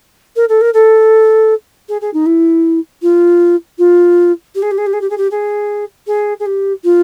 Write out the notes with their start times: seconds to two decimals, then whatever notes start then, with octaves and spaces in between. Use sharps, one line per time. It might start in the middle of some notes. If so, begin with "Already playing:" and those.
0.36 A#4
0.49 A4
0.61 A#4
0.73 A4
1.88 G#4
2.01 G#4
2.13 D#4
2.26 E4
3.02 F4
3.78 F4
4.55 G4
4.62 G#4
4.71 G4
4.78 G#4
4.86 G4
4.93 G#4
5.01 G4
5.10 G#4
5.17 G4
5.31 G#4
6.06 G#4
6.39 G#4
6.46 G4
6.84 F4